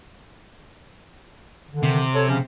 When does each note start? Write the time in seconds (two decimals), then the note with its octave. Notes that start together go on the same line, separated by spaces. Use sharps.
1.69 D3 D#3
1.83 C3
2.14 A4 C#5
2.28 C#3 F3 C#4